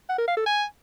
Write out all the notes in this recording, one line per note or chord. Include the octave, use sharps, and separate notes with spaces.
F#5
A#4
F5
A4
G#5